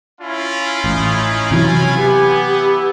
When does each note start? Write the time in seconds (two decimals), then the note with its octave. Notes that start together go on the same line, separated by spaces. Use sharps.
0.21 C#4 E4 F4
0.84 A1 D#4
1.51 C3 E3 F#3 G#5
1.96 B3 G4
2.58 E4